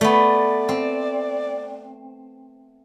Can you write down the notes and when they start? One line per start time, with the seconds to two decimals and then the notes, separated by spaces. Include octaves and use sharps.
0.01 A3 B3 D5
0.69 C4